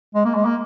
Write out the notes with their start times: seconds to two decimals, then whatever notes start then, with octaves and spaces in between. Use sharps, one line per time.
0.15 G#3
0.25 A#3
0.35 G#3
0.45 A#3